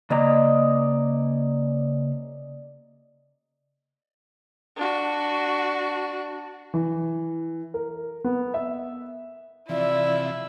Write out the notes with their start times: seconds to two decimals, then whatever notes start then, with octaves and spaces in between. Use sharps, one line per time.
0.10 C#3 A#3 D5 D#5 A#5
4.76 D4 F#4
6.74 E3
7.74 A#4
8.24 B3
8.54 E5
9.69 C3 E3 F3 E4 D5 E5 E6